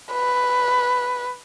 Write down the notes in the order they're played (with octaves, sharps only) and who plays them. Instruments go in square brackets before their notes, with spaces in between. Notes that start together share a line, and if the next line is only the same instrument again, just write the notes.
[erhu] B4